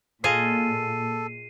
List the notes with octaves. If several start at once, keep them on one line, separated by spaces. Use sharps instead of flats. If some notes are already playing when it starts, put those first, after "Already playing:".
A#2 F4 G#4 A4 D#5 C7 D#7